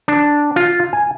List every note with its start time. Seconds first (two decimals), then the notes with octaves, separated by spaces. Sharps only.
0.08 D4
0.56 F4
0.93 G#5